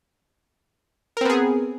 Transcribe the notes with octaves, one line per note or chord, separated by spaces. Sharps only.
B3 C4 G#4 A#4